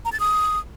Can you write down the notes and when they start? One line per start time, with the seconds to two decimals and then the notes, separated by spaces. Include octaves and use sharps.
0.05 A#5
0.12 A6
0.20 D#6